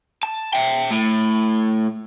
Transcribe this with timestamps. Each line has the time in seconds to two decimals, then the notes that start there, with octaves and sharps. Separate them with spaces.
0.23 A5
0.53 E5 G5
0.91 A2